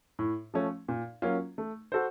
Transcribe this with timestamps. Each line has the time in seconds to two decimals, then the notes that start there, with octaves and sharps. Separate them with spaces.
0.19 A2
0.54 F3 A3 C#4
0.88 A#2
1.22 F#3 A#3 C#4 F4
1.58 A3
1.92 F#4 A4 C5